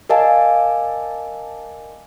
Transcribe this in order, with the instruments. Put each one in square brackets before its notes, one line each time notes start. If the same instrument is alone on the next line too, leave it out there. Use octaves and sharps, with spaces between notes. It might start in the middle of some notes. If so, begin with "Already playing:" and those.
[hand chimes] A#4 D#5 G#5 [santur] D5 F5 A5